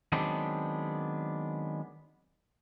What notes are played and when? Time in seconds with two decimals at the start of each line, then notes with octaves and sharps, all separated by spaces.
0.12 D#3 F#3 G#3 B3 C4 D4